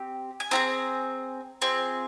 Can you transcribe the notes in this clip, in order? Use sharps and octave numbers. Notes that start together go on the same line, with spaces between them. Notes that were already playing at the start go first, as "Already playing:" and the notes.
Already playing: C4 G4
G#5
C4 F4 G#4 A#5
C4 F4 G#4